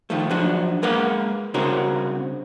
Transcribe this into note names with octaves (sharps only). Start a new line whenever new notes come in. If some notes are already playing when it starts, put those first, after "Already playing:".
D#3 F3 A3
F3 F#3 D4 F#4
G#3 A#3 A#4 B4 F5 F#5
C2 C#3 C4 D4 F#4 A#4